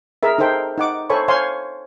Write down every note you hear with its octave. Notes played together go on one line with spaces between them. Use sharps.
G#4 A#4 E5
D#4 A4 A#4 C5 G5
D#4 F#5 D6
A4 C5 C#5 G#5 B5 C#6
C5 C#5 F5 G#5 C6